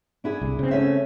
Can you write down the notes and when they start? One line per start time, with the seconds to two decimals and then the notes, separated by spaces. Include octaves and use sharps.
0.24 D4 E4 G#4
0.41 C2
0.59 C#3 C4
0.71 A3 C#4 E5